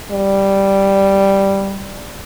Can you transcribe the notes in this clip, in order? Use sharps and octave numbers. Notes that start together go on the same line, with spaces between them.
G3